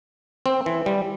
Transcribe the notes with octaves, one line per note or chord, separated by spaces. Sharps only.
C4
E3
G3